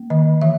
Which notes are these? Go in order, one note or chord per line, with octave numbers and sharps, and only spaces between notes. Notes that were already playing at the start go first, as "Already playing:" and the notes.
Already playing: A#3
D#3 D#5
E3 E5